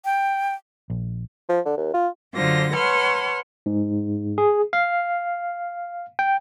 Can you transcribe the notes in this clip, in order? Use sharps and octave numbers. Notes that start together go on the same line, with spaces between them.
G5
A#1
F3
D3
D#2
F4
F#2 D3 F#3 F4 C5 A#6
B4 C#5 F#5 A5 C6 F6
G#2
G#4
F5
G5